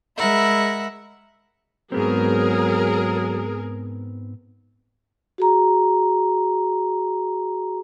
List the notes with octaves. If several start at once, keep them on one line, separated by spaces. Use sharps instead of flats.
G#3 A#4 E5 F#5 B5
G#2 F#3 B3 C4 G#4 A#4
F#4 G#4 A#5